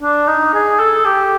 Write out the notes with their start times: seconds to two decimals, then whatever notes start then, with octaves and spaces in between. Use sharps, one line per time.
0.02 D4
0.28 D#4
0.54 G#4
0.79 A4
1.05 G4